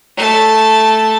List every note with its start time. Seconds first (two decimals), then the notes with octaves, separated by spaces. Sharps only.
0.17 A3 A5